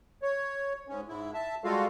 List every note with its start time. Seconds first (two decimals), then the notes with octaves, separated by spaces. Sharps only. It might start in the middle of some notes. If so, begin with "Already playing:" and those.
0.22 C#5
0.88 G#2 C#4
1.08 G#2 E4
1.34 E5 A5
1.64 G3 G#3 F4 F#4 A4 F5